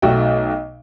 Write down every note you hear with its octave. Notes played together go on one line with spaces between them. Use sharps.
B1 A3 D#4 F#4 G5